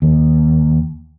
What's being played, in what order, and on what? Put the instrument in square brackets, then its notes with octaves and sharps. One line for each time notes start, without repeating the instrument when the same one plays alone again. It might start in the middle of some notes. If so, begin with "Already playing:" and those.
[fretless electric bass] D#2